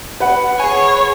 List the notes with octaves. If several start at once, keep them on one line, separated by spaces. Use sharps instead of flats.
B4 F#5
G#4 C#5 G#5